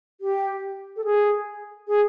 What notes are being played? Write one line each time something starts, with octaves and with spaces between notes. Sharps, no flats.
G4
A4
G#4
G#4